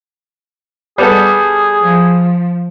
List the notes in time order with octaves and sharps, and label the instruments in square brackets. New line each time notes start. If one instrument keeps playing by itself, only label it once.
[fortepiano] G3 B3 A4 [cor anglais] G#4
[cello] F3